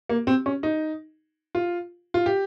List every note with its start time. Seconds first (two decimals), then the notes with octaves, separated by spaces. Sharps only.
0.09 A#3
0.27 C4
0.46 C#4
0.63 D#4
1.55 F4
2.14 F4
2.26 G4